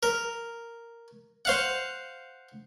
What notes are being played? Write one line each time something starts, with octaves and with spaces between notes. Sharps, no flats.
A#4
C5 F5 F#5